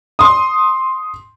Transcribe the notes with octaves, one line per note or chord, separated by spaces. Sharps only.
C6 D#6